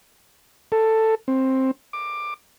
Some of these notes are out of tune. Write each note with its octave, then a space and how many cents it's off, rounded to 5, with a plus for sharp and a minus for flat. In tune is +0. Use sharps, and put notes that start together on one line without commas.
A4 +10
C4 +10
D6 +15